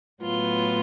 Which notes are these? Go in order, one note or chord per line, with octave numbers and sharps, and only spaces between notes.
A2 F#3 B3 F4